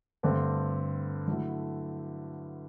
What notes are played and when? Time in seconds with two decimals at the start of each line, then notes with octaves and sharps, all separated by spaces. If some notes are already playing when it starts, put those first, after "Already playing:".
0.23 G2 D3 A3 C4
1.27 D3 F#3 A3 E4